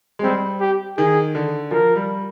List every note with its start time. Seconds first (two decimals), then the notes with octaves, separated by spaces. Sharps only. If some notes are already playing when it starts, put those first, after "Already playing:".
0.19 G#3
0.23 G3 C4
0.60 G4
0.97 D#3 G#4
1.35 D3
1.71 F3 A#4
1.96 G3